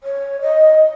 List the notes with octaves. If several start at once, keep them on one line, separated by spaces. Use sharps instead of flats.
C#5
D#5